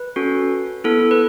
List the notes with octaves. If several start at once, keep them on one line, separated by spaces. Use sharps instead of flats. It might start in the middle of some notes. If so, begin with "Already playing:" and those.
Already playing: B4
C#4 F#4 A4
B3 E4 A4
B4